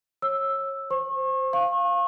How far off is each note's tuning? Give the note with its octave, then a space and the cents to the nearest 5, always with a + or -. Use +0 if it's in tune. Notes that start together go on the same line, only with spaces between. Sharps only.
C#5 -30 E6 +0
C5 +0 C#6 -35
F5 +0 C#6 -35